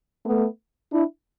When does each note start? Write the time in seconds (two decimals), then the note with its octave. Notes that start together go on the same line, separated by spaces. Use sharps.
0.24 A3 B3
0.92 D4 E4